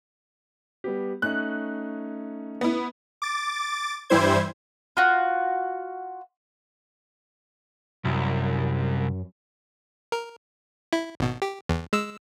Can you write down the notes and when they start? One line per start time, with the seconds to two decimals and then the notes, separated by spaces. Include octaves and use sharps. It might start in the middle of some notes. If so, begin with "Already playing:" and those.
0.84 G3 B3 G4
1.22 A3 C#4 D#4 F#6
2.61 B3 E4
3.22 D6 A6
4.10 G2 E3 G3 E4 C5 G#6
4.97 F4 F#4
8.05 C2 F#2
10.12 A#4
10.93 E4
11.20 G#1 B2
11.42 G4
11.69 E2
11.93 G#3 E6